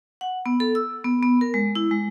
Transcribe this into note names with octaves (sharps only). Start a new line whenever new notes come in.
F#5
B3
A4
E6
B3
B3
A#4
G#3
E4
G#3